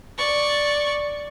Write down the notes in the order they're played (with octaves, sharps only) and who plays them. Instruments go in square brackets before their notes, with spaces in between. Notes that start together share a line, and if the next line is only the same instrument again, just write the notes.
[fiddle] D5 C#6